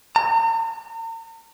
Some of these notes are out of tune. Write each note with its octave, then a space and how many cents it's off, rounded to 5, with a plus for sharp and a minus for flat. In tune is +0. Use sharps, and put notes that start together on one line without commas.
A#5 -40